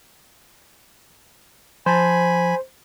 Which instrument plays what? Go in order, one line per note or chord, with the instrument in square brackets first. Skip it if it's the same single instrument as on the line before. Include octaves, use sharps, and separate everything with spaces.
[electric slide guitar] F3 A5 [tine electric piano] C5 [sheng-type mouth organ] G#5 B5